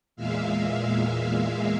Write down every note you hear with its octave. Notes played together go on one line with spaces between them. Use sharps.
E2 A#2 G#3 E5 F5